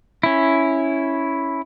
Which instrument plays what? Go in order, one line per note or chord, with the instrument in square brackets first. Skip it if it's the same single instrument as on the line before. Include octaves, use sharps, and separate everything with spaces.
[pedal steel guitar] C#4 E4